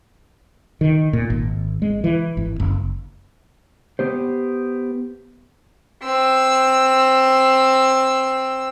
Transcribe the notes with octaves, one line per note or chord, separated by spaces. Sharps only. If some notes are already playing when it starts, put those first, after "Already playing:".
D#3
A#2
G#1
G#3
E3
G#1
F#1
B3 G4 C5
C4 E6